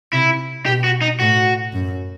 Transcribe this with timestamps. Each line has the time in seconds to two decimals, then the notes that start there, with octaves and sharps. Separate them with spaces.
0.13 C3 E4
0.66 B2 G4
0.84 F#4
1.01 D#4
1.20 A2 F#4
1.73 F#2